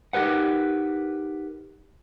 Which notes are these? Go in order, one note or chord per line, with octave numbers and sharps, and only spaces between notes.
D#4 G4 A#4 B4 F#5